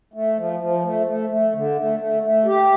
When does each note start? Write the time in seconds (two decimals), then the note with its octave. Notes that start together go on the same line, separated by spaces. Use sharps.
0.14 A3
0.37 F3
0.60 F3
0.84 A3
1.07 A3
1.30 A3
1.53 D3
1.77 A3
1.99 A3
2.23 A3
2.45 G4